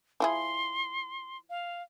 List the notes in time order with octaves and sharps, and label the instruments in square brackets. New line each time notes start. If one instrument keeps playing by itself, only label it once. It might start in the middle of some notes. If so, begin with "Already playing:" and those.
[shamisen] F3 E4 G#4 [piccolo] C6
[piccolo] F5